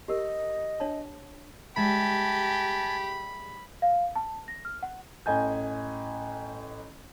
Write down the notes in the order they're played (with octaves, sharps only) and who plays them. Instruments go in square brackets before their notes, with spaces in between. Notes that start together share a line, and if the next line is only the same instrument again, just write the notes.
[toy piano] G4 A#4 [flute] D#5
[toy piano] D4 C#5 A5
[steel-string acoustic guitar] G3 G#3 E5 [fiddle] G4 [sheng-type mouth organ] G#5 A5 [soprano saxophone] B5
[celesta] F5
A5
A#6
F6
F#5
[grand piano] A1 D#5 G#5 G6